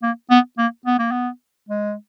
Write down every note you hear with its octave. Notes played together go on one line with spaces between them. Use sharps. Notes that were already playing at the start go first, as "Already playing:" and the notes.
A#3
B3
A#3
B3
A#3
B3
G#3